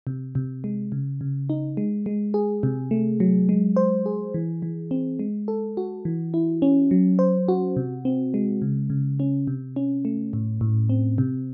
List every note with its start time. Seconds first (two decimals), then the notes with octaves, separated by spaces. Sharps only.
0.07 C3
0.35 C3
0.64 G#3
0.92 C#3
1.21 C#3
1.50 D#4
1.77 G#3
2.06 G#3
2.34 G#4
2.63 C3
2.91 A3
3.20 F#3
3.49 G#3
3.77 C5
4.06 G#4
4.34 E3
4.62 E3
4.91 C4
5.19 G#3
5.48 A4
5.77 F#4
6.05 E3
6.34 E4
6.62 C#4
6.91 F#3
7.19 C5
7.48 F#4
7.77 C3
8.05 C4
8.34 G#3
8.62 C#3
8.90 C#3
9.20 C#4
9.47 C3
9.76 C#4
10.05 A3
10.33 A2
10.61 A2
10.89 C4
11.18 C3